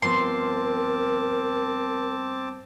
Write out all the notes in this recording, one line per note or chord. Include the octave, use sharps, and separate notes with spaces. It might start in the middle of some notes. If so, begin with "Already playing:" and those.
G2 F3 B3 C4 A#4 A5 C6 D6